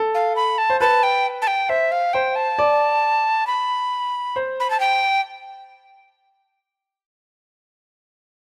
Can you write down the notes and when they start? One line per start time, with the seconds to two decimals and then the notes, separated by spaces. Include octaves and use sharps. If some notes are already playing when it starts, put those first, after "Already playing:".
Already playing: A4
0.15 F5
0.36 B5
0.58 A5
0.70 C5
0.81 B4 A5
1.03 G5
1.42 A5
1.47 G5
1.69 C5 E5
1.92 F5
2.13 C5 G5
2.36 A5
2.58 D5
3.47 B5
4.36 C5
4.60 B5
4.70 A5
4.80 G5